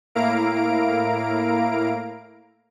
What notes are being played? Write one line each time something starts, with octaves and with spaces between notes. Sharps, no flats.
A2 A#3 E4 F5 A#5 D7